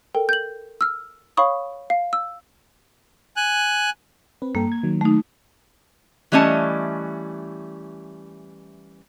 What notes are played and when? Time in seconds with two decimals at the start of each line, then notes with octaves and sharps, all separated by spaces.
0.15 A4 A#4 G5
0.29 G6 F#7
0.81 E6 F6
1.37 C#5 F5 B5 C#6 D#6
1.90 F5
2.13 E6
3.37 G#5 F#6
4.42 C4 B4
4.55 G2 A#3 A4 G5
4.72 G#6
4.83 D#3 F#3
5.01 A3 D#4
6.32 E3 G3 A3 C#4 D#5 A5